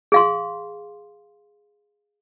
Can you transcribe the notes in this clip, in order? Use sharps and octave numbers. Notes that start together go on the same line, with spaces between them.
G#4 F5 C6